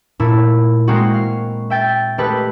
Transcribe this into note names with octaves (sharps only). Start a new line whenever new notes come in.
A#2 A3 E4
G#3 A#3 C4 F#4
F5
E5 G5 A6
G#3 A3 G4 A4 B4